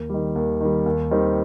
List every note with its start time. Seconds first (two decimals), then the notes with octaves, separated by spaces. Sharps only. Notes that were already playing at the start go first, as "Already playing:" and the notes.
Already playing: D#2
0.10 D#3 G3
0.36 D#2
0.61 D#3 G3
0.86 D#2
1.11 D#3 G3 C4